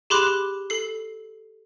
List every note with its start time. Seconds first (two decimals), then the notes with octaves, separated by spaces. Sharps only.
0.10 G4 G#4 B5 C6 D6 F#6
0.70 A4 C7